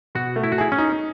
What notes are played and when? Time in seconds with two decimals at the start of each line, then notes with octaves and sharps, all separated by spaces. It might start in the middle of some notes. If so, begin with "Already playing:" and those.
0.15 B2 F#4
0.36 A3
0.44 E4
0.52 F#4
0.58 E4 G#4
0.72 C#4
0.78 D#4